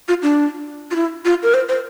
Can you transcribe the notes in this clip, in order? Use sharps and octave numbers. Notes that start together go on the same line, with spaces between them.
F4
D4
F4
E4
F4
A#4
C5
C5